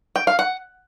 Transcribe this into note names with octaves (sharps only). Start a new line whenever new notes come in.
G5
F5
F#5